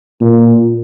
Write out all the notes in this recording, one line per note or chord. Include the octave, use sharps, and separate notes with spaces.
A#2